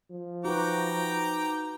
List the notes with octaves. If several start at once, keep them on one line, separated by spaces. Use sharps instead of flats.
F3
D#4 F#4 B4 G5 A#5 D6